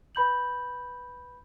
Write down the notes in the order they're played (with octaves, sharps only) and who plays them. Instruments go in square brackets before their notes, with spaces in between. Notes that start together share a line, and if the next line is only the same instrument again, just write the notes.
[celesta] B4 B5 G6 F#7